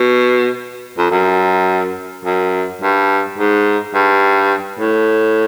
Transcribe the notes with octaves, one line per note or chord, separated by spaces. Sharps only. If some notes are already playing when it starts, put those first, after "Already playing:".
Already playing: B2
F2
F#2
F#2
G2
G#2
G2
A2